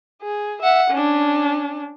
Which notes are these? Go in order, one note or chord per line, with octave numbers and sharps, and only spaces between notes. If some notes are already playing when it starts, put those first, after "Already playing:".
G#4
E5 F#5
C#4 D4